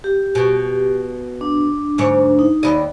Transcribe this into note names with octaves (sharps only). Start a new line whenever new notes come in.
G4
B2
D4
D2 G#2 C#5
D#4
D#2 D5 D#5 B5